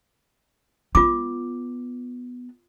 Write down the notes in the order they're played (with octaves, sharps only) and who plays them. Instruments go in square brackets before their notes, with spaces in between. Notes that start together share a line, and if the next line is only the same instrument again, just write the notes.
[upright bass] B3 [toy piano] F4 D6